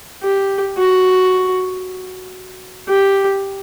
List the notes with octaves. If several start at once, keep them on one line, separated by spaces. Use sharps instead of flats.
G4
F#4
G4